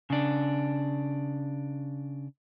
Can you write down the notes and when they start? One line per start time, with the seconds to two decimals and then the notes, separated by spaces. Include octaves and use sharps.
0.10 C#3 D4